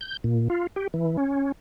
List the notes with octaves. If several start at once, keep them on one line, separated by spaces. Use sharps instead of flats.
G6
A#2
F4
G4
E3
C#4